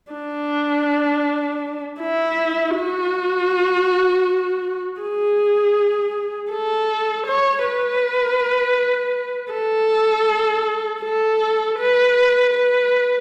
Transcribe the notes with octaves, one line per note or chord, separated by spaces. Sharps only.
D4
E4
F#4
G#4
A4
C#5
B4
A4
A4
B4
B4